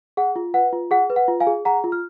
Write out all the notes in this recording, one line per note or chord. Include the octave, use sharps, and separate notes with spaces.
G#4 F#5
F4
B4 F#5
F4
G#4 F#5
B4
F#5
F4
F5 G#5
G#4
G#4 F#5 A#5
F4
F6